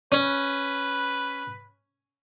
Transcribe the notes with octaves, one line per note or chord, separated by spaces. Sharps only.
C#4 B4